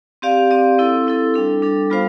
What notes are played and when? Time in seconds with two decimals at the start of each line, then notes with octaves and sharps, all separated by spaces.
0.22 C4 G4 D5 F5
0.51 C4 G4 D5 F5
0.78 C4 E4 A4
1.07 C4 E4 A4
1.34 G3 D4 A4
1.62 G3 D4 A4
1.90 G3 B3 F4 C5 F5